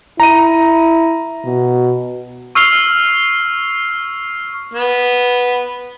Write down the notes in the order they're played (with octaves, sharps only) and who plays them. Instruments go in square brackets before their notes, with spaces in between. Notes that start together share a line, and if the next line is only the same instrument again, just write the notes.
[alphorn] E4 [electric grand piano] A#5 D#7
[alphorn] B2
[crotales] C#6 E6 F6 C7 F7 G7
[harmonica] B3